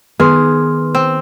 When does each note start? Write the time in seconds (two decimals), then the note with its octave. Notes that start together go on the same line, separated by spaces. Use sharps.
0.20 D#3 B3 G#4 C6 F6
0.95 C4